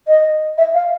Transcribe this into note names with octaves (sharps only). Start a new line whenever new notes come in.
D#5
E5
F5